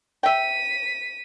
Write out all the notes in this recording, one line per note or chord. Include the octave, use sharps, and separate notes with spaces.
E5 G5 B6 D#7